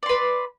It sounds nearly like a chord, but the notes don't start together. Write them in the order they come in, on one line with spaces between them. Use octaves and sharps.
D5 C6 B4